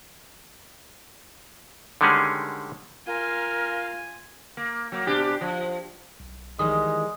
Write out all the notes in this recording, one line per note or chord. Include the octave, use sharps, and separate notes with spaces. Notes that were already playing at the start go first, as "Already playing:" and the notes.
D3 D#3 G3 G#3 C#4 G#4
F4 A#4 F5 G#5 C6
A#3
F#3 A#3
B2 D4 G4
F3
B1
D#3 E3 G3 G#3 D#6